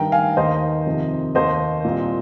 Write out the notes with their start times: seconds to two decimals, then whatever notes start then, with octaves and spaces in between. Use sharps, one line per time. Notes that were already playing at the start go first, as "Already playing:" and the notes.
Already playing: G2 D#3 G5 A#5
0.12 F5 G#5
0.37 D#2 D#3 C5 D#5
0.86 F2 C3 D#3
1.35 D#2 D#3 C5 D#5
1.84 C2 A#2